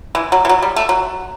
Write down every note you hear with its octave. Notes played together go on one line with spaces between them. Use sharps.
E3
F#3
E3
F#3
G3
A3
F#3